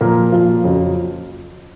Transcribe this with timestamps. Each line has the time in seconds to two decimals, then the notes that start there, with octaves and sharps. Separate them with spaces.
0.01 A#2 F3 A#4
0.32 A#2 F3 F4
0.64 F2 C#3 F#3